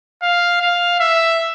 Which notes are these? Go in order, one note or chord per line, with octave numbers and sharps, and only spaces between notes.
F5
F5
E5